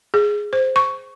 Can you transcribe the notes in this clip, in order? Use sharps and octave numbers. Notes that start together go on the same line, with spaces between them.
G#4
C5
C#6